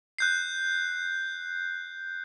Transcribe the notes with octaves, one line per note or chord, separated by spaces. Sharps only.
F#6 G6 C7